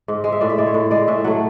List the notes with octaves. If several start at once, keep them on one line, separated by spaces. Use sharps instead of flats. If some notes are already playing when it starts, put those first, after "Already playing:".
G#2
G#3
E5
A2 D5
E5
G#3 D5
C#5
A2
G#3 D5
A2 E5
F#3 A3 F#5